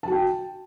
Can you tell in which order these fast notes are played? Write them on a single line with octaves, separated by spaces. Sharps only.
A5 F#4 G5